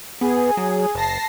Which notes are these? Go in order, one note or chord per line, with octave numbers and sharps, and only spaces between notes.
B3 G#4
F#3
F#1 A5 A#6 C7